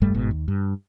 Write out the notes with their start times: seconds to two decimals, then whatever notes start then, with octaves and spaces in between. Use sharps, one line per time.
0.01 F1 G2 G3 A3
0.14 G1 G#2 B2
0.31 D#2
0.48 G2